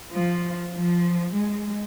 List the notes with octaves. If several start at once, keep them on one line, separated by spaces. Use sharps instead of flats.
F3
F3
G#3